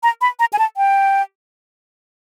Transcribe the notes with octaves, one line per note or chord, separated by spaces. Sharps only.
A#5
B5
A#5
G#5
A5
G5